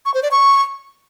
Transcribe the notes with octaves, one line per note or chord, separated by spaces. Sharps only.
C#6
C5
D5
C#6